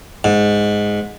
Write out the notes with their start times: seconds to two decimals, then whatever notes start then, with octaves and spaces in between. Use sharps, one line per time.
0.24 G#2